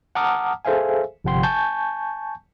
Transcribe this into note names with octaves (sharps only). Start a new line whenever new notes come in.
F#5 A5 A#5 D6 D#6 F6
G#4 A4 C5 E5 F5 G#5
G1 C3 F3 F#5 G5 C6
G#5 A5 C#6 G6